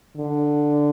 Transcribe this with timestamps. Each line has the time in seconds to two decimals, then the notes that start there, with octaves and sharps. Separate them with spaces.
0.17 D3